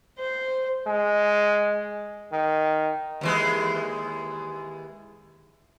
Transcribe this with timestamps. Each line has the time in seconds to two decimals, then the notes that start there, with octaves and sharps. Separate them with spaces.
0.20 C5
0.87 G#3
2.32 D#3
3.21 D#2 E3 G#3